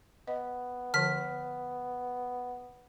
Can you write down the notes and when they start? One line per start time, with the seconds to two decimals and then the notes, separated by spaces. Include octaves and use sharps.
0.28 B3 D#5
0.94 D3 F3 F6 B6